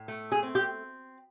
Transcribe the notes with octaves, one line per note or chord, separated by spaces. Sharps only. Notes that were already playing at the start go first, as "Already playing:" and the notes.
Already playing: A2
A3
G#4
C4
G4